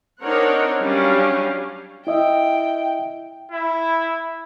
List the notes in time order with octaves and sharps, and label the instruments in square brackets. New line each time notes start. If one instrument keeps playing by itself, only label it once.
[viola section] C4 D4 D#4 A#4 C#5 F#5
F#3 G3 C#4 D4 F5
[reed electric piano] E4 D#5 E5 [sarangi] G5
[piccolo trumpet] E4